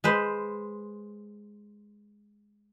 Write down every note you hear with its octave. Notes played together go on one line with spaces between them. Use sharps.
G#3 B4 C5